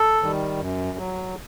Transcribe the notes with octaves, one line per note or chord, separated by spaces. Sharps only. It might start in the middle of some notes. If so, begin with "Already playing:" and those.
Already playing: A4
D#3 G3
F#2
F#3